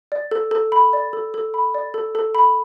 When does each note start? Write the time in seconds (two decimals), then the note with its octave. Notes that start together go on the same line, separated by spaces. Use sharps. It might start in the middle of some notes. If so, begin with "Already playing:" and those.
0.12 D5
0.31 A4
0.51 A4
0.72 B5
0.93 D5
1.13 A4
1.34 A4
1.54 B5
1.74 D5
1.94 A4
2.15 A4
2.35 B5